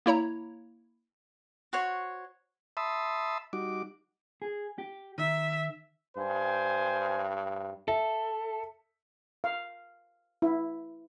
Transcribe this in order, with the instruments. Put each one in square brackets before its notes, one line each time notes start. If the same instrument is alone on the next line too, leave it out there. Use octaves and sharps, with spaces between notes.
[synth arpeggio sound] A#3 E4 C#5 A#5
[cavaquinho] F#4 C5 C#5
[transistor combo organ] E5 A5 B5 C6 D#6 E6
G3 D#4 F#4 D6
[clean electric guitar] G#4
G4
[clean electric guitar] D#3 [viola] E5
[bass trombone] G2 [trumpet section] C5 G5 G#5
[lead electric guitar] A4 [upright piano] E5
[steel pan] F5
E4